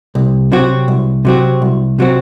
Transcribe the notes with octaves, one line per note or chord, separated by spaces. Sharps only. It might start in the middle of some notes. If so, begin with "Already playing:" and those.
C2
C3 F#3 C4 F#4
C2
C3 F#3 C4 F#4
C2
C3 F#3 C4 F#4